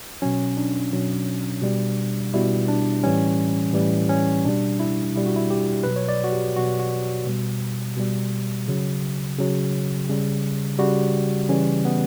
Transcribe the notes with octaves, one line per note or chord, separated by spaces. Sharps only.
B2 F#3 C#4
D4
B2 F#3
B2 G3
B2 G3 E4
D4
A2 E3 G3 C#4
A2 E3 G3
C#4
B2 G3 D4
E4
B2 G3 E4
F#4
E4
G4
B2 F#3 B4
C#5
D5
F#4
G4
B2 F#3 F#4
F#4
B2 G3
B2 G3
C#3 F#3
C#3 F#3
C#3 G3
C#3 G3 F#4
C#3 E3 G3 C#4
B3